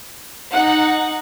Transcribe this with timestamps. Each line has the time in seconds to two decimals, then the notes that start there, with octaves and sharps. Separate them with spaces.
0.52 D#4 F#5